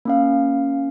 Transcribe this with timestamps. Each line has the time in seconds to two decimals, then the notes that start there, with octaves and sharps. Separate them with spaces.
0.05 A#3 C#4 F5